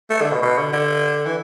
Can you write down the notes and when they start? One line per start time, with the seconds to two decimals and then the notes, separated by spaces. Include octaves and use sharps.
0.10 A3
0.21 D3
0.32 B2
0.42 B2
0.58 D3
0.72 D3
1.26 E3